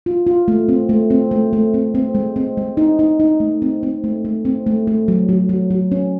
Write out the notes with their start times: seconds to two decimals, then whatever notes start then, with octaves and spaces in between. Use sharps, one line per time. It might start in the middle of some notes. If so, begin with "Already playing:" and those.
0.06 F4
0.27 F4
0.48 A3
0.69 C4
0.89 A3
1.10 C4
1.31 A3
1.53 A3
1.74 C4
1.95 C4
2.15 G#3
2.36 C4
2.57 G#3
2.77 D#4
2.99 D#4
3.20 D#4
3.40 A3
3.62 C4
3.83 C4
4.04 A3
4.25 A3
4.45 C4
4.66 A3
4.87 A3
5.08 F#3
5.29 F#3
5.49 F#3
5.70 F#3
5.92 C#4